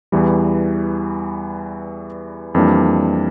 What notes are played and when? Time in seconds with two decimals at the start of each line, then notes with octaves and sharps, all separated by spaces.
0.12 E2 E3 G3
2.55 F2 E3 G3 A#3 D4